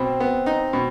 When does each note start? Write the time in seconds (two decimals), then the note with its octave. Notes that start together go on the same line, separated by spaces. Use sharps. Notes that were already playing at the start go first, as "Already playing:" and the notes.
Already playing: B2 C4
0.20 B3
0.46 D#4
0.73 B2